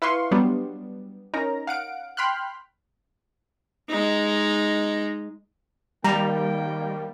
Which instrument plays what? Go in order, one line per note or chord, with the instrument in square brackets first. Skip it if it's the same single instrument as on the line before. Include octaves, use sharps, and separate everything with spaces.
[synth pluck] E4 B4 F5 C6 C#6
F#3 G3 B3 D4
C#4 D#4 A#4 A#5
F5 F#5 D7
G5 B5 C6 F6 F#6
[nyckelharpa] G#3 D#4
[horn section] D#3 G5 [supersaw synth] G3 [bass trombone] A#3 [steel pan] A#5